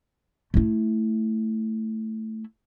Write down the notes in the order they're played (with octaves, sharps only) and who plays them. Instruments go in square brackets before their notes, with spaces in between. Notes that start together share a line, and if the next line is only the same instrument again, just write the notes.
[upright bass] A3 E4